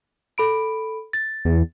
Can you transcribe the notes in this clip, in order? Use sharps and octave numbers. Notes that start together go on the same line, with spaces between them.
A4 B5 D7
A6
E2